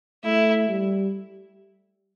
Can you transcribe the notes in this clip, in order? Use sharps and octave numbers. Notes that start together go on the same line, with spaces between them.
A3 E4
G3